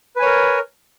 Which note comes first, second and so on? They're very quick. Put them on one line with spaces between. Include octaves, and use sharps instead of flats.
B4 G#5 C#5 A#4